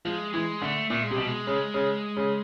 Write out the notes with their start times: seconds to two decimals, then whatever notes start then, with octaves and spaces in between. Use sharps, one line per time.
0.05 F3 G#3
0.33 E3 G#3
0.62 D3 A3
0.90 A#2 A3
1.03 G#3
1.11 C3
1.15 B2 G3
1.27 G#3
1.47 C#3
1.74 C#3
2.17 C#3